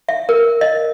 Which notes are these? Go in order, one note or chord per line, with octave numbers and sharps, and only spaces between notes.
E5
A#4
D#5